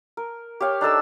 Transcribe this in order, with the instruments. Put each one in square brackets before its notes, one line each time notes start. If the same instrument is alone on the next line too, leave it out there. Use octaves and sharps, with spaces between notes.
[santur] A#4
G4 C#5 F5
D4 D#4 A4 E6